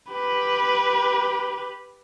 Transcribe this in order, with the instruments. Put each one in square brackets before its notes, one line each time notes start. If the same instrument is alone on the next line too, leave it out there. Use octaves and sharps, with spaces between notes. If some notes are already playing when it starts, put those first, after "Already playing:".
[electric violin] G4 B4